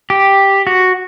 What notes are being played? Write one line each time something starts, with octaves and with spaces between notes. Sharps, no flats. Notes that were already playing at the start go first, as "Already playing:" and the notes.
G4
F#4